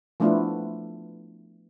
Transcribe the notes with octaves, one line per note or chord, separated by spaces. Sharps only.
F3 A3 B3 D4 E4 F4